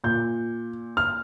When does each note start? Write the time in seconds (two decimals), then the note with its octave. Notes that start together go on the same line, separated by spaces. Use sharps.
0.04 A#2 G6
0.97 F6